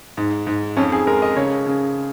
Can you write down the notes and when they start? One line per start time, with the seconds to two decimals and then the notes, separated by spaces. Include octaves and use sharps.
0.17 G#2
0.47 G#2
0.77 F2 C#4
0.92 G#4
1.07 G#3 A#4
1.22 D#5
1.36 C#3 C#5
1.66 C#3